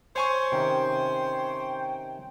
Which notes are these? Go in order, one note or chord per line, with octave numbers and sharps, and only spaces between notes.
C5 C#5 G#5 C#6
C3 D#3 C#4 G5